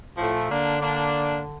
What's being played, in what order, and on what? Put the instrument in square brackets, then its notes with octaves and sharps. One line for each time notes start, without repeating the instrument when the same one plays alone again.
[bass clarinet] A2 [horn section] F3 A3
[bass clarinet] A#2
[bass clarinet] D3 [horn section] A#3 D4
[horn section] A#3 D4